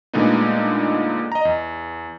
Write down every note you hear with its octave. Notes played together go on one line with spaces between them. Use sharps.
A#2 D3 G#3 A3 B3 D#4
D#5 A#5
E2